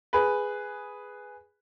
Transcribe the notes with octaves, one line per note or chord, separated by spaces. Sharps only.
G#4 B4